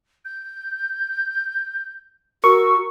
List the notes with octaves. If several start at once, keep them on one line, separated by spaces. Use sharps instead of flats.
G6
F#4 A#4 C#6 E6